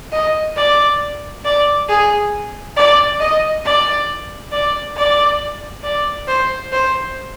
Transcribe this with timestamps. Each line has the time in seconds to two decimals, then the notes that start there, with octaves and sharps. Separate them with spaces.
0.13 D#5
0.56 D5
1.45 D5
1.89 G#4
2.76 D5
3.20 D#5
3.65 D5
4.52 D5
4.96 D5
5.84 D5
6.28 C5
6.72 C5